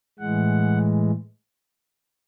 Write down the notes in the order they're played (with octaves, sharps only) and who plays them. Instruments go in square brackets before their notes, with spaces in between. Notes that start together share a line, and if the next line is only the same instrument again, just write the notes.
[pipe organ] A2 E3 G#3 F#5